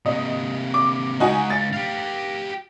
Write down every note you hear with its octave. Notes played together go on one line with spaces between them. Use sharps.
C3 A#3 D#5
D6
C#2 D#4 F#4 G#5
A6
G4 F5